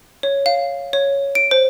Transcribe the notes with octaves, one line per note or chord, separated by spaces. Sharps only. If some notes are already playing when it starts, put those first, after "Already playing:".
C#5
F5
C#5
D7
C5